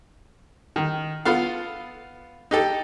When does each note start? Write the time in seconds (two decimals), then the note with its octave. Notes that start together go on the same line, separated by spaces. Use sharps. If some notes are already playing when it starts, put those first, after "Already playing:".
0.76 D#3
1.25 B3 F4 A4 F5
2.51 D#4 G4 A4